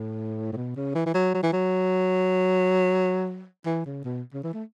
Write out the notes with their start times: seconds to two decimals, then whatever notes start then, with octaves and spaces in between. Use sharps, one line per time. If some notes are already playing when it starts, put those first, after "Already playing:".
Already playing: A2
0.53 A2
0.57 B2
0.76 C#3
0.95 E3
1.06 E3
1.14 F#3
1.34 F#3
1.43 E3
1.53 F#3
3.66 E3
3.85 C#3
4.05 B2
4.34 C#3
4.44 E3
4.54 A3